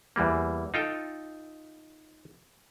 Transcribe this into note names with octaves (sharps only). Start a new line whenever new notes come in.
E2 E3 G3 A#3
D#4 F4 A4 G5